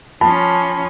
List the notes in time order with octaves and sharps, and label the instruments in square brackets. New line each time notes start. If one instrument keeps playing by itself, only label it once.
[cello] F3 C#4 [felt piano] A5 [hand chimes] B5